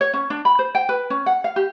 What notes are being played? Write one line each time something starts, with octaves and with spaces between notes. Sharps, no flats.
C#5
C#4
D4
B5
C5
G5
B4
C#4
F#5
F5
G4